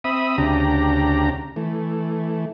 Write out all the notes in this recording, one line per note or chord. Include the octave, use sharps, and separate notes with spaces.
C4 E5 B5 D#6
D2 C#3 D4 G4 A#5
E3 A3